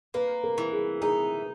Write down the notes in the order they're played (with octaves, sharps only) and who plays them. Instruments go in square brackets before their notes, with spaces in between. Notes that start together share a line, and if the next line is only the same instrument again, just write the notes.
[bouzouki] A#3 [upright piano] B4
[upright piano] A#4
[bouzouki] E3
[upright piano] G#4
[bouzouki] D#4 [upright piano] G#4